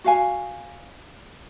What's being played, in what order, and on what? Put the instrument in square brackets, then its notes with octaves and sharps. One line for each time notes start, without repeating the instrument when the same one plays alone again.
[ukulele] F#4 F5 G#5